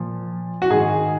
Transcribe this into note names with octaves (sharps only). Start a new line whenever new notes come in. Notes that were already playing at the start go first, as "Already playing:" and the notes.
Already playing: A#2 F3
F#4
G#2 D#3 G#4